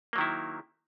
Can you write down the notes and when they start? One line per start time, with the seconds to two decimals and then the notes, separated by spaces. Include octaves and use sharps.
0.13 A#3
0.16 F#3
0.18 D#3
0.21 E4